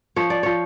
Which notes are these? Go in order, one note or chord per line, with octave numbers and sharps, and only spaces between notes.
F3 C#5
D5
F3 C#5